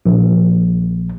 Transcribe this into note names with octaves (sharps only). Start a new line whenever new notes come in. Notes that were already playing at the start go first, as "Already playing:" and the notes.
A#1